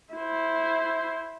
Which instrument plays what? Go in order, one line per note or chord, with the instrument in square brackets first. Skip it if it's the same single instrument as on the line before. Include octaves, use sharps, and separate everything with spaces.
[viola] E4 C5